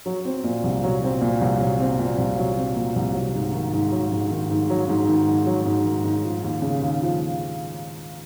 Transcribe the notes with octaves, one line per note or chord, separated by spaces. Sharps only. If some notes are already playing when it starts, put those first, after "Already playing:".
F#3
C4
A#2
C2
F#3
C4
A#2
C2
F#3
C4
A#2
C2
F#3
C4
A#2
C2
F#3
G#2
D#3
G#2
F#3
G#2
D#3
G#2
F#3
G#2
D#3
G#2
F#3
G#2
D#3
G#2
F3
D#2
C#3
D#2
F3